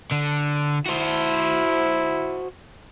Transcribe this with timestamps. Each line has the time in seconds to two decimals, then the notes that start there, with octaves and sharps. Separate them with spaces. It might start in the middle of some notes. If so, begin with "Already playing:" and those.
0.11 D3
0.86 E4 F#4 C5